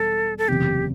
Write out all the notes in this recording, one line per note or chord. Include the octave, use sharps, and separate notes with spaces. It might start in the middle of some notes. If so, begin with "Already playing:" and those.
Already playing: E1 G3 A4
A4
F#1 E2 C3 G4